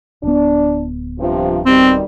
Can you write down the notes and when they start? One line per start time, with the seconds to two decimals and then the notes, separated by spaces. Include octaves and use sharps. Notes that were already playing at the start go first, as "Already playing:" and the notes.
0.23 D1 B3 D4
1.20 G2 C3 F3
1.66 B2 D#3 G3 C4